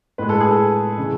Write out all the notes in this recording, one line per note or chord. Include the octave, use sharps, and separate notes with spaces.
A2 G#3 B4
A4
G#4
A4
C#3 E3 G#3